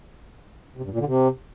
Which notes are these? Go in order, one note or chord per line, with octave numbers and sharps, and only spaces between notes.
C3
G2
A#2
D3
C3